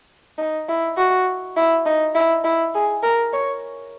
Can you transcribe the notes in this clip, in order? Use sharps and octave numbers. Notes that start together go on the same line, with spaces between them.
D#4
E4
F#4
E4
D#4
E4
E4
G#4
A#4
C#5